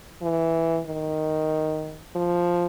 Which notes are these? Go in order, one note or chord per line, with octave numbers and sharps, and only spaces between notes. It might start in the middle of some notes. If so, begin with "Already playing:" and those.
E3
D#3
F3